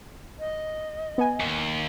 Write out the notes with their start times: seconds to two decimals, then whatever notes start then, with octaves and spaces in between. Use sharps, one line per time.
0.39 D#5
1.18 B3 G#5
1.40 D#2